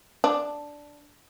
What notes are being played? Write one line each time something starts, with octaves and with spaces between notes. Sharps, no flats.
D4